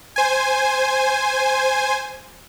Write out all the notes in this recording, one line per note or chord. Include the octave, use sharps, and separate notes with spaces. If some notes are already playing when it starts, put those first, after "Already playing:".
C5 G#5